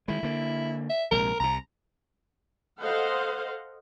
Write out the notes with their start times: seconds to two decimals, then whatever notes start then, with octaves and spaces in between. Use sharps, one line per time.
0.08 D#3 G#3 E4
0.23 D3 A#3
0.90 E5
1.11 A#1 C3 G#3 A#4
1.40 C2 C3 A#5
2.81 A4 C5 D#5 F5 F#5